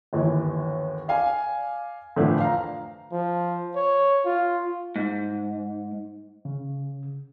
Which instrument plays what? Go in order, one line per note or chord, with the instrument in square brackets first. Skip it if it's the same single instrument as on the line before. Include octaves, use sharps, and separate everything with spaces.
[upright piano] G1 D#2 E3
D5 F5 G#5
A2 D3 E3 F3 A3 D4
F5 A#5
[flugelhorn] F3
C#5
F4
[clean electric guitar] G#2
[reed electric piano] C#3